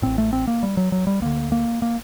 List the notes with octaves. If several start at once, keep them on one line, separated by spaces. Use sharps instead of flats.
A1 A2 C4
A3
C4
A#3
G3
F#3
F#3
G3
D2 D3 A#3
A#3
A#3